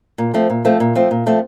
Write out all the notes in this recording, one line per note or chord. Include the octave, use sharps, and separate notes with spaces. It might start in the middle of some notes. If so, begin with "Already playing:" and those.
A#2
F3 A3 C4
A#2
F3 A3 C4
A#2
F3 A3 C4
A#2
F3 A3 C4